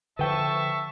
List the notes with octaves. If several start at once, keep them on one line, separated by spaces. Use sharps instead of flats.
D3 F3 B4 E5 G5 A5 C#6